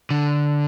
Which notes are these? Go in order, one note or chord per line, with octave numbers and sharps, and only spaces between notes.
D3